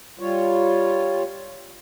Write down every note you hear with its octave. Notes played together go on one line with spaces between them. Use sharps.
G3 F4 C#5